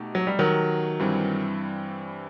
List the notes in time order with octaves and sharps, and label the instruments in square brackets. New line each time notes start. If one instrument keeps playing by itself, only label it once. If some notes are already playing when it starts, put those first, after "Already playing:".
Already playing: [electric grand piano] B2 A3 D#4 G4
[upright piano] F#3
G3
D#3 F#3
[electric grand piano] G2 E3 G3 C4